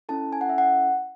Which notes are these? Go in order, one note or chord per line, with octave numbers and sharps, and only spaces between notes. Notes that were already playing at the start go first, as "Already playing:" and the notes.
C#4 E4 A4 A5
G#5
F#5
E5
F#5